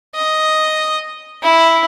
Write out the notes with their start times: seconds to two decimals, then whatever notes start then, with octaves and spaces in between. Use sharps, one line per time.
0.15 D#5
1.43 E4